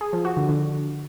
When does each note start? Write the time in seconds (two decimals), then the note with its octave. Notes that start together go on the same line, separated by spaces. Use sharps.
0.01 G#4
0.13 F3
0.25 F#4
0.37 D3
0.49 D3